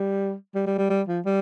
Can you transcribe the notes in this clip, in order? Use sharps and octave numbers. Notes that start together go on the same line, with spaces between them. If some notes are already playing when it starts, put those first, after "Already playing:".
Already playing: G3
G3
G3
G3
G3
F3
G3